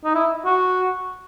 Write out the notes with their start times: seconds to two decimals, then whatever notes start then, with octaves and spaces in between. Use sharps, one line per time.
0.04 D#4
0.15 E4
0.45 F#4